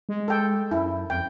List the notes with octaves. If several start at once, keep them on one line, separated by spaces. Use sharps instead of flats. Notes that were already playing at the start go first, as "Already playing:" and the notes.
G#3
A4 G5
F#2 E4
F2 G5